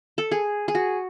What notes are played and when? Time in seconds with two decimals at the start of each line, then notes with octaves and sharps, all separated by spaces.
0.18 A4
0.31 G#4
0.68 G#4
0.75 F#4